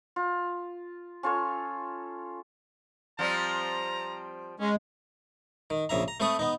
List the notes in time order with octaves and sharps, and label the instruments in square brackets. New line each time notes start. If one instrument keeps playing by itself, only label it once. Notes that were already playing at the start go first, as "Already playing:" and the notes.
[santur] F4
C#4 F4 A4 C#5
[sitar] F3 G3 C4 [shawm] A#5
[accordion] G#3 [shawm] C#4
[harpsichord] D#3
A#1 C#3 E5 A#5
A#5
A3 C4 A4 B4 C#6 D#6
B3 D#4